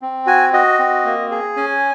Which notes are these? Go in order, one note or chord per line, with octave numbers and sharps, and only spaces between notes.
C4
F#4 G#5
F#4 D#5
C4
A#3
G#4
C#4 G#5